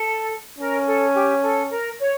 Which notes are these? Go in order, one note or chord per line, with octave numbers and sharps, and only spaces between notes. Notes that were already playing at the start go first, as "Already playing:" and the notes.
Already playing: A4
C#4 A#4
A4
G4
A4
A#4
C#5